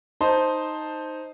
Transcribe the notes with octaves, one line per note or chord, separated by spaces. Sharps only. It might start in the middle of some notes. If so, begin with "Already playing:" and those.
D#4 C5 A5 C6